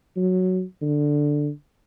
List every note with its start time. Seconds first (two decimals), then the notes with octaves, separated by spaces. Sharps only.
0.16 F#3
0.82 D3